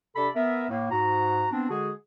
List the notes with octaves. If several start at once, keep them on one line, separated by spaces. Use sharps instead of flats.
C3 D4 A4 D5 B5
B3 A#4 E5
A2 A#3
G#2 F#4 A#5
B3 C4 D4
D3 G#3 F#4 G#4